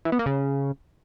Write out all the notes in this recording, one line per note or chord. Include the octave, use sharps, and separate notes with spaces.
E3
B3
A#3
C#3